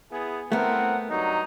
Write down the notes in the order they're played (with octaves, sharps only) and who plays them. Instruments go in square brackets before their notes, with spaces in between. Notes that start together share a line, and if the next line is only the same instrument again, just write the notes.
[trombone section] B3 E4 G#4
[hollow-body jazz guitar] A3 B3 [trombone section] C4 E4 A#4 [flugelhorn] F#5
[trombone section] G2 F#3 [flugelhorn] D#4